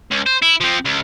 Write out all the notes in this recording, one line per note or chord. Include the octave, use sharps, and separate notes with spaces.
C#2
C5
E4
F3 C4
C#2